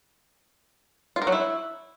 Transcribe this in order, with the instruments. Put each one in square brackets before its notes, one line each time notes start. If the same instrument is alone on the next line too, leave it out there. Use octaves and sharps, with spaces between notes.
[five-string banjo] F4
A#4
F#3
E4